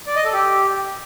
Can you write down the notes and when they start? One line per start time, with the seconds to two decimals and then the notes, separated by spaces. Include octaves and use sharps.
0.07 D5
0.16 D#5
0.24 A4
0.33 G4